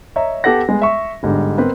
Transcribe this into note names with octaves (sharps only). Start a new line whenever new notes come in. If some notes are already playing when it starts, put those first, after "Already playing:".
C#5 D#5 E5 A#5
B3 G4 A4 B4 F#5 A#6
G#3 B3
E5 C#6
G1 G#2 D3 G3
B3 C4 A#4 B4